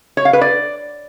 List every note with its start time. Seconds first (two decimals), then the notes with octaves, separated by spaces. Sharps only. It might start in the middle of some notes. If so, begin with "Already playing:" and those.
0.17 C#5
0.25 F5
0.33 B4
0.41 D5